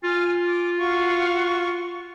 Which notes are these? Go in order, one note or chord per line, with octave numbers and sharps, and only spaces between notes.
F4 G#5 F6
D6
F#4 F5 C#6